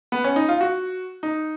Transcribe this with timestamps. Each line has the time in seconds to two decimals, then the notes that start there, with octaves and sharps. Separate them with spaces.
0.12 B3
0.24 C#4
0.36 D#4
0.49 F4
0.61 F#4
1.23 D#4